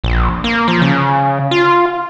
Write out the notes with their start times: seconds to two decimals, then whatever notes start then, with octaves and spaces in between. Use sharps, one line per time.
0.04 A#1
0.44 A#3
0.68 F3
0.82 C#3
1.51 F4